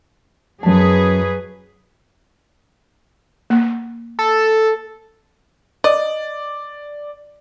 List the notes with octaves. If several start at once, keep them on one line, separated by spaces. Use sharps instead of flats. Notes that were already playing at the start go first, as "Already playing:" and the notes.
F#2 F#3 G#4 B4 A5
A#3
A4
D5 D#5